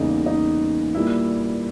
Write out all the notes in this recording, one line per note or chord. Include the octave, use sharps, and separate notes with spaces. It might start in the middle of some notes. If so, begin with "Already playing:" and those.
Already playing: E2 C#3 G3 A#3 D#4
D#4
A#2 G3 A#3 E4